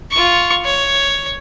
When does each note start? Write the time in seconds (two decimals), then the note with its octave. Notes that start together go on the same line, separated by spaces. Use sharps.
0.12 F4 C#6
0.65 C#5